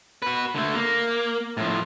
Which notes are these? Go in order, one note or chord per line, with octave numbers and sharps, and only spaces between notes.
F#4 B4
D3 A3
A#3
A2 F3